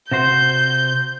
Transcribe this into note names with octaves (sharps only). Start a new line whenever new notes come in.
C3 F#4 C5 G6